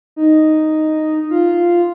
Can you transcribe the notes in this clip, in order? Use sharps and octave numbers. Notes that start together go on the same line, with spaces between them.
D#4
F4